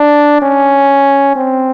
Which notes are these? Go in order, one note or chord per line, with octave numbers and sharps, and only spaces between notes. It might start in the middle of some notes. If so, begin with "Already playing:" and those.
Already playing: D4
C#4
C4